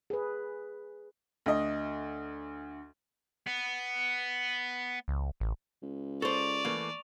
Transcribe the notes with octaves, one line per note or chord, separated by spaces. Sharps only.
G#4 B4
D2 D#5
B3
C#2
A1
C#2
A4 C5 D5 C#6 F7
E3 A3 A#3